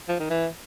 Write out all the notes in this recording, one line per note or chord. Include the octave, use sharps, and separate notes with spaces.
F3
D#3
E3